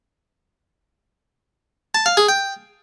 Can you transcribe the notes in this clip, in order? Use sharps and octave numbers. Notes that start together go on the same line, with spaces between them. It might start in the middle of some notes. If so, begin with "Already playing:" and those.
A5
F5
G#4
G5